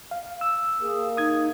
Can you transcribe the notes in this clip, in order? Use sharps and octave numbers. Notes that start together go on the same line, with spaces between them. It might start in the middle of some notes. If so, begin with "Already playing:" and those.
F5
E6
A#3 G#4
D#4 D#6 G#6